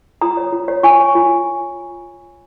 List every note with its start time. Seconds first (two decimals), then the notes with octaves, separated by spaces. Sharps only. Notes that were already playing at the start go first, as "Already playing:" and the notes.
0.21 F4 A#5 D#6
0.37 C#5
0.53 F4
0.68 C#5
0.83 F4 G#5 C#6
0.99 C#5
1.15 F4